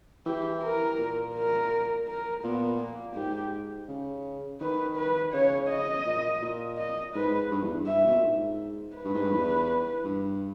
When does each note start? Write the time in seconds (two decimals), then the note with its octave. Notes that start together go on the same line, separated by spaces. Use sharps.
0.26 E3 G4
0.62 A#4
0.98 A#2
1.34 A#4
2.08 A#4
2.44 A#2 B3
2.80 A#3
3.15 G#2 G4
3.88 C#3
4.61 D#3 B4
4.97 B4
5.33 C#3 C#5
5.70 D#5
6.06 A#2
6.42 A#2
6.78 D#5
7.15 G#2 B4
7.51 G2
7.63 E2
7.74 G2
7.87 E5
8.05 B2
8.14 A#2
8.23 G#2
8.96 B4
9.05 G2
9.14 G#2
9.22 G2
9.32 E2
10.04 G2